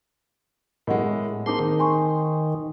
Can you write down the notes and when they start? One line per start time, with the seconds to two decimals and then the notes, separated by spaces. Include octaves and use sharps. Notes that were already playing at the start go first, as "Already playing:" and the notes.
0.87 A2 G#3 A#4 D#5 F#5
1.46 A#3 C4 D#4 G#4 A5 C6 D6
1.59 D#3
1.79 G#5 C6 C#6